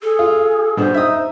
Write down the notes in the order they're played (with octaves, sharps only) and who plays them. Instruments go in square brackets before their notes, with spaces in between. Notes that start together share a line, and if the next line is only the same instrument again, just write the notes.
[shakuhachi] G#4 [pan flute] A4
[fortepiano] F4
[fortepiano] G2 B2 [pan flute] C5
[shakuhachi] D#4 [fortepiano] E5 D#6